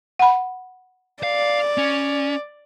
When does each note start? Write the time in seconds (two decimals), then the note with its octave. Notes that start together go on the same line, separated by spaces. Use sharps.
0.19 F#5 B5
1.23 D5 F5
1.78 C#4